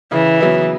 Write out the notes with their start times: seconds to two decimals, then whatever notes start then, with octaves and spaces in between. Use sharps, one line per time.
0.12 C#3 E3
0.40 F#3 B3 E4